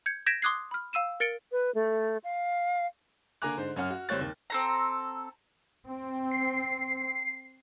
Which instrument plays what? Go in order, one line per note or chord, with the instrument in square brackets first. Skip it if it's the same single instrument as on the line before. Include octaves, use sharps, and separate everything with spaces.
[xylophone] G6 G#6 C#7
G6 G#6 A#6 B6 D7 E7
C6 D6 D#6 F#6 G#6 C7
B5 F6
F5 E6 D#7 E7
A#4 A6 C#7 D7 G7
[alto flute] B4
A3
F5
[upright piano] D3 A#3 G#5 A#5 D6 F#6
G#2 D3 C5
F#2 C#4 F#5 F6
F#4
F#1 G3 C4 C#5 F#6 A6
D#2
[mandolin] C4 A4 A#5
[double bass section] C4
[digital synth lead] C7